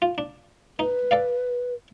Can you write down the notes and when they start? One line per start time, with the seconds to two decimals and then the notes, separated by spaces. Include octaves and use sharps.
0.02 F4
0.18 D4
0.79 D#4 B4
1.11 A4 D5 F5